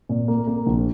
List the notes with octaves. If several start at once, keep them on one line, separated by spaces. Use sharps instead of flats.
A#2
A#3
A#3
A#1